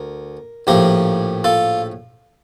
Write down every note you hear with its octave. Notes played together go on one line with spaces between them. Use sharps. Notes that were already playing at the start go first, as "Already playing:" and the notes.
Already playing: D2 A#4
A#1 A2 F3 G4 A#4
F4 A4